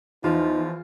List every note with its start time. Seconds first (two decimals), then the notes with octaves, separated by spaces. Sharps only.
0.24 E2 F3 D#4 F4